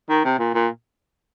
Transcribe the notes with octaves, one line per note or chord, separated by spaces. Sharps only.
D#3
C3
A#2
A#2